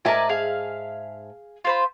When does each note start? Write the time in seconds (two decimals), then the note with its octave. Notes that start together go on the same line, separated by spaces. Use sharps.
0.05 G#2 A#4 D5 E5 G#5 A5
0.29 G#4 F5
1.65 F4 C5 B5